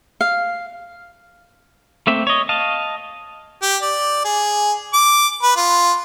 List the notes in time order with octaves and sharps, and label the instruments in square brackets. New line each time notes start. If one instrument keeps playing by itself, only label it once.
[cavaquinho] F5
[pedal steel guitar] A3 A#3 C4 E5
C#5 D#5
D#5 F5 A5
[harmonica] G4
D5
G#4
D6
B4
F4